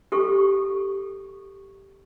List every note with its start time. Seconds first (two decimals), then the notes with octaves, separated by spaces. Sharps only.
0.12 G4 A4 C#6